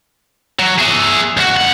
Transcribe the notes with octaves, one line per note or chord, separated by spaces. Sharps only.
F#3
G#4 E5
C#2 F#4
C3 F#5